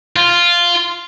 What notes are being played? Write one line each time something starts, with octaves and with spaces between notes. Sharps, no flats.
F4